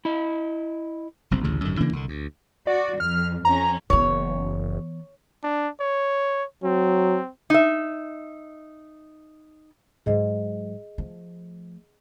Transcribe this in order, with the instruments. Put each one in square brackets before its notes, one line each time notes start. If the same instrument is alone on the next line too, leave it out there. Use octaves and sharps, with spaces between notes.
[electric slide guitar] E4 D#5
[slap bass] F#1 C2 C4
A1 D2 C#3
G#1 F#2 D3 D#3
C#3 E3 A#3 D4
C2 D3
D2
[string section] F#4 [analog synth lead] D5
[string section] F2 [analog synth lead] F6
[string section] F2 C#4 [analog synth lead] A#5
[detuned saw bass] F#1 [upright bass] E3 B3 [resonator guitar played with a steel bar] C#5
[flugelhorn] D4
C#5
[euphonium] F#3 [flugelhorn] C4
[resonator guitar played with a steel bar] D#4 E5
[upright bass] G#2 F#3 [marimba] G#4 D#5
[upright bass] F3 A3